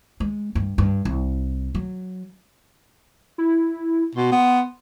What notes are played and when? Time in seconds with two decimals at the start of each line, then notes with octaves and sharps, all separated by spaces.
0.20 G#3
0.55 G2
0.78 G2
1.05 C2
1.75 F#3
3.38 E4
4.15 B2 C6
4.32 B3